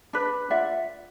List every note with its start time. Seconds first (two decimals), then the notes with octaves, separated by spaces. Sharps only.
0.13 D4 B4
0.50 F4 D5 E5 F#5